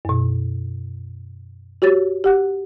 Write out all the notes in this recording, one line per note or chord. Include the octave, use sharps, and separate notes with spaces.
F#2 B2
F#4 G4 C#5 A6
G4 F#5 F#6